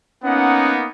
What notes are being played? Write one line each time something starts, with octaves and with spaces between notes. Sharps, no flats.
A#3 B3 C#4 D#4 F#5